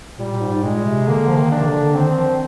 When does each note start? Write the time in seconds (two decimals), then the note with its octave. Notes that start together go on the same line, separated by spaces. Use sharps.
0.19 A#2 G3
0.31 A#2
0.41 G#2
0.55 G#2
0.63 A#2 G#3
0.85 C3
1.07 D3 A#3
1.28 F3
1.36 D#3
1.51 D4
1.61 C3
1.66 D3
1.95 D#3 C4
2.18 F3